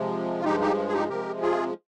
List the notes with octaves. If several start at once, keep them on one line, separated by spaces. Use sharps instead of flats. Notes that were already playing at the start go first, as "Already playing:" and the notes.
Already playing: C3 F3 G#3
F4
G2 F3 G#3 D#4 G4
D#4 G4
G#4
D#4 G4
C3 F3 G#3 G4 A#4
F4 G#4